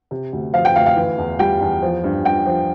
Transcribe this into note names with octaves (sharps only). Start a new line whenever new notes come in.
C3
D2
F3 F5
G5
D2 F5
F5
E3
E2
G3 G5
E2
F3
G2
G2 G5
F3